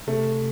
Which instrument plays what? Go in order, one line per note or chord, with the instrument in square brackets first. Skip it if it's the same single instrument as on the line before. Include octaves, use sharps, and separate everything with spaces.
[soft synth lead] C3 [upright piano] A3